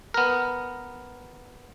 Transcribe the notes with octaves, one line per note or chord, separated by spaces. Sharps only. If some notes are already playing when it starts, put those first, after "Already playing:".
B3 A#4